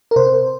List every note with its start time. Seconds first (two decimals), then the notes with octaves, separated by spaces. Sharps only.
0.11 A#4
0.16 C3 C5